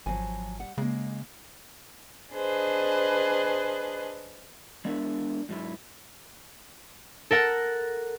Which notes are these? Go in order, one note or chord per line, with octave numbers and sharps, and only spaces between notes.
G#1 F3 F#3 G#5
G3 F#5
C#3 G#3 A#3
D4 G#4 B4 C5 D#5
G#3 B3 D4 A#4 D5 E5
G#2 F#3 E4
A4 A#4 F#5